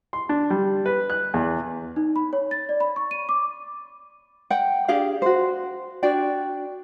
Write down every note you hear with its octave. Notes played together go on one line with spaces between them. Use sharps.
C6
D4
G3
B4
F#6
E2
D#4
B5
C#5
A6
D5
B5
C#6
D#7
D6
F#5 G5
D4 G4 G#4 F5
F#4 C5
D4 F#4 D5 G5